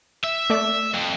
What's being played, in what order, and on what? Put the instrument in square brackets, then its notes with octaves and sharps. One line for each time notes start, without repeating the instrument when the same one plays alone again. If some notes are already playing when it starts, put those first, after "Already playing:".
[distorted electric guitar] E5
[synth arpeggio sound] A3 D5
[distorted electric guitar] F2